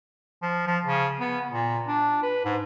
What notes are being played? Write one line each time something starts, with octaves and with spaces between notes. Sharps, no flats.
F3
F3
C#3
B3
A#2
D4
B4
G#2